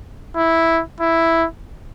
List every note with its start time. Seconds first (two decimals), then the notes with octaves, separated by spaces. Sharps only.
0.36 E4
1.01 E4